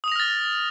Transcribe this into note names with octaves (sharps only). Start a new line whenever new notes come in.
D#6 F6 A6 A#6 F7